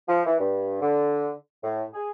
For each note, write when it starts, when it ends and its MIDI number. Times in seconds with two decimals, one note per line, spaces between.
0.08 0.20 53
0.25 0.34 52
0.40 0.76 43
0.81 1.31 50
1.64 1.82 45
1.93 2.10 68